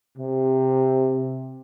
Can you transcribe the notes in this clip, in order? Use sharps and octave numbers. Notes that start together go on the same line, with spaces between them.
C3